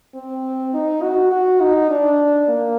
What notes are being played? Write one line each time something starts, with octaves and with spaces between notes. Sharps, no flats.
C4
D#4
F#4
F#4
D#4
D4
A#3